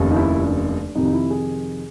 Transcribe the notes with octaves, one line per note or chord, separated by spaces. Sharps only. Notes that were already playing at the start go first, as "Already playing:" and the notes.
Already playing: F1 D#2 C#3
D#4
E4
D4
F2 C3 D#3 D#4
D#4
E4
G#4